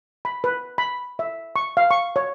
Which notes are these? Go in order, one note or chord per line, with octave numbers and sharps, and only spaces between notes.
B5
B4
B5
E5
C#6
F5
C#6
C#5